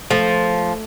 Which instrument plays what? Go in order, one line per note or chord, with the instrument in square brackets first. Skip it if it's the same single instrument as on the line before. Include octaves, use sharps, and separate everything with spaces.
[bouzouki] F3 [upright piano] A3